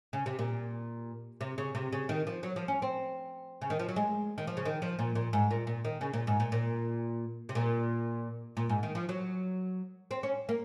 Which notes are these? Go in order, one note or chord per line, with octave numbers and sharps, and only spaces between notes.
C#3
C3
A#2
C3
C#3
C3
C#3
D#3
F3
F#3
F3
C#4
C4
C#3
D#3
F3
F#3
G#3
D#3
F3
C#3
D#3
F3
A#2
A#2
G#2
A#2
A#2
D#3
C#3
A#2
G#2
A#2
A#2
C3
A#2
A#2
G#2
D#3
F3
F#3
C4
C#4
A#3